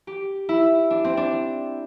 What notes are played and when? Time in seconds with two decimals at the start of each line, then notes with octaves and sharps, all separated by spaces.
0.07 G4
0.49 E4
0.90 D4
1.04 C4
1.17 D4